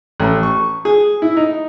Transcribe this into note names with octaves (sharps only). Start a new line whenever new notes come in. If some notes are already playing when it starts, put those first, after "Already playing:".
A1
C#6
G#4
E4
D#4